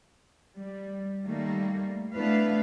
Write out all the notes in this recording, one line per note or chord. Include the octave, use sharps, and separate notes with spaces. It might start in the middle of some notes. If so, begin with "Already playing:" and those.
G3
D#3 G3 A3 A#3
A3 B3 D4 E4 B4 F5